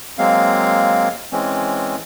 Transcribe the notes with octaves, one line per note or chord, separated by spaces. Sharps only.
F#3 G#3 A#3 C4 F5
E3 G#3 C4 C#4